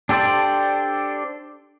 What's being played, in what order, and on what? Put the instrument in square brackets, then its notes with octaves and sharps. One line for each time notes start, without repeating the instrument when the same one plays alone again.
[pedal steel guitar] D4 G4 A4 C5 D5